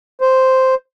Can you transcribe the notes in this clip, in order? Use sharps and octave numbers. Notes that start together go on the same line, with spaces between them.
C5